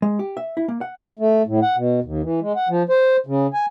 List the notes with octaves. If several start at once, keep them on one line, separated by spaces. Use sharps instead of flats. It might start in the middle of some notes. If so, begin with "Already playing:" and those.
G#3
G4
E5
E4
A#3
F#5
A3
A2
F#5
B2
D#2
E3
G#3
F#5
F3
C5
C#3
G#5